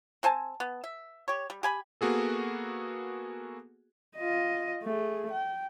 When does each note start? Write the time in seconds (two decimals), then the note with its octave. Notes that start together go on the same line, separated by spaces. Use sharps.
0.23 C4 C5 G#5 A5
0.60 B3
0.84 E5
1.28 G4 C#5
1.50 G3
1.63 G4 G#5 B5
2.01 A#3 B3 F#4 G#4 A4
4.17 F4 D#5
4.83 A3 G#4
5.31 G5